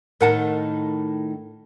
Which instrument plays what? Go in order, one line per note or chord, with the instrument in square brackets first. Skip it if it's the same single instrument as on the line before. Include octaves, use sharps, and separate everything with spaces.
[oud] A2 D#3 D#4 [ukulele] A#4 F#5 A5